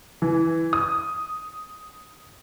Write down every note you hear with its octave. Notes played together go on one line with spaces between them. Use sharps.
E3
D#6